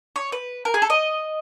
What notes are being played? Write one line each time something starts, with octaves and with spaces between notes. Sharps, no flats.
C#5
B4
A#4
G#4
A4
D#5